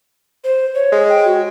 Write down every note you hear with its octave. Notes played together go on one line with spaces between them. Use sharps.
C5
C#5
G#3
G5
F#4